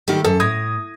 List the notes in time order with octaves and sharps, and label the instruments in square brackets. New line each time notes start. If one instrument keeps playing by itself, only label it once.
[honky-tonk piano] D#3 G3 [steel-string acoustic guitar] A3 G4
[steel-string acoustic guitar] F#2 [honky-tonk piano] A4
[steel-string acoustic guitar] A2 [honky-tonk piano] D#6 G#6 A#6